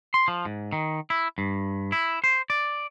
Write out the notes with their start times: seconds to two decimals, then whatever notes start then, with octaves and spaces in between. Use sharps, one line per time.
0.14 C6
0.28 F3
0.45 G#2
0.72 D#3
1.10 E4
1.38 G2
1.92 E4
2.24 C5
2.50 D5